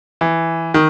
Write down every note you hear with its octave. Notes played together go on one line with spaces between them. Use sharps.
E3
D#3